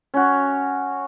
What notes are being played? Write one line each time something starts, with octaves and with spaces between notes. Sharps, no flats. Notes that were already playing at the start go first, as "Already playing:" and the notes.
C#4 F#4